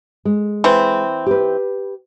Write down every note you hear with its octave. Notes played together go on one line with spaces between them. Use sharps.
G#3
E3 C4
G4 B4